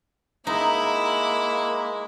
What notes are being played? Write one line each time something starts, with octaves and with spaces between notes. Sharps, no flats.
G#3 A#3 D#4 E4